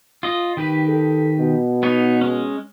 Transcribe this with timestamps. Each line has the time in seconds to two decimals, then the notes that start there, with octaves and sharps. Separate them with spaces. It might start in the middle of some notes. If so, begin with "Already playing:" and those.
0.23 F4 D#5
0.57 D#3 G4 B4
0.88 A4
1.39 B2
1.83 B3 D#4 C#5
2.21 G#3 C#4